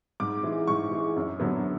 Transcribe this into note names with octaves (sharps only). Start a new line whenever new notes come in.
G#2 D6
E3 G#3
G#2 C#6
E3 G#3
F#2
D3 F#3 B3